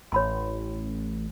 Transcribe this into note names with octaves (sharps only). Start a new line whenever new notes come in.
A1 C#5 B5 C6